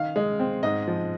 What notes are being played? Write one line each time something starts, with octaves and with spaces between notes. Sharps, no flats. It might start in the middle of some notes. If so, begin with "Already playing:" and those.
Already playing: D#3 F5
G#3
C4
G#2 D#5
F3